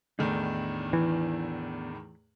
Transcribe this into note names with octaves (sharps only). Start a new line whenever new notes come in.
E2 A2 D#3 B3 D4 D#4
E3